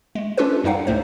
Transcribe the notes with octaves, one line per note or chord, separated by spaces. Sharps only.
G#3 A3
C#4 D4 F4 G4 A4 B4
F#2 G3 D#4 F5 F#5
C#2 A2 A3 C5